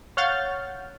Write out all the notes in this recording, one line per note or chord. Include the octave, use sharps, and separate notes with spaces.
C#5 F5 F#5 F6 G6 A6